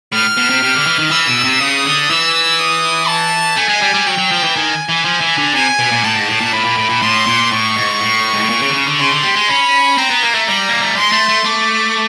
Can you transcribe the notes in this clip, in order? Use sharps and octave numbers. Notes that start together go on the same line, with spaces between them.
A2 F6
B2
C3
C3
D3
E3
D#3
E3 E6
B2
C3
C#3 D#6
D3
E3 E6
D#6
A5
A3 G#5
G#3
G3
G3
F#3 G5
F#3
F3
E3
D#3 G#5
E3
F3
E3
D3
C3 G#5
B2
A#2
A2 A5
G#2
A2
A#2
A2 B5
A#2
A2
A#2
A2 C6
A#2
A2 C#6
G#2
A2
G#2
A2
A#2
C#3
D3
C#3
D3
C#3 C6
D3
G3
G#3
C#4 B5
C4 A#5
B3
A#3
A3
G3 A#5
A#3
A3
G#3 C6
A3
A3
A3 D6